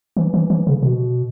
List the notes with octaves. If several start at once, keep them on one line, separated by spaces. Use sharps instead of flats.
E3
E3
E3
C#3
B2